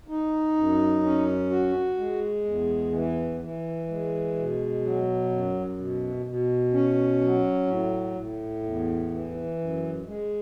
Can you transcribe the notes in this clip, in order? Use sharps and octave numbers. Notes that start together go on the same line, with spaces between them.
D#4
F#2
C#4
F#4
G#3
E2
E3
E3
G#3
B2
F#3
F#2
B2
B2
C#4
F#3
A2
A2
E2
E3
F#2
G#3